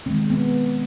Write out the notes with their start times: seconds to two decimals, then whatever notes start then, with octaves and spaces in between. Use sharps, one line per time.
0.06 D#3 G#3 C4
0.30 B3